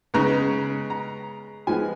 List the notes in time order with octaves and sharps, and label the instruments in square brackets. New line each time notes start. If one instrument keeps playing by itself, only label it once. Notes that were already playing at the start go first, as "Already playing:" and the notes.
[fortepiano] C#3 G#3 B3 A#5
A#5
F3 G#3 B3 G#5